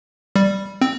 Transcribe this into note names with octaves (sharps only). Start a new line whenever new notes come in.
G3
C4